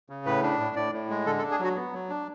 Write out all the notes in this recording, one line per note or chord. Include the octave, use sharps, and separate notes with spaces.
C#3
A2 B4
D4
A2
A2 D5
A2
G#3
D3 A4
A4
D4
G#4
F#3 F#4
B3
F#3
D4